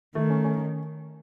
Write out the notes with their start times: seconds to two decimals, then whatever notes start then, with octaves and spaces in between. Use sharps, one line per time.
0.15 D#3 A3
0.30 C#4
0.44 C#4